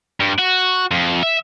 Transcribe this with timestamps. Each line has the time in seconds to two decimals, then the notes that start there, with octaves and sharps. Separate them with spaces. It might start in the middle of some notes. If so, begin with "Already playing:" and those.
0.20 G2
0.39 F#4
0.91 F2
1.23 E5